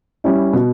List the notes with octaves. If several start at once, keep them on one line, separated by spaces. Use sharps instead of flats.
G3 C#4 E4
B2